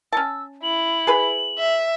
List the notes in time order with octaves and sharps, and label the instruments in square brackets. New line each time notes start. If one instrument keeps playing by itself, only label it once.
[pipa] C#4 A5 [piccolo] E6
[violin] E4 [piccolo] F#7
[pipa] G#4 B4 B5
[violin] E5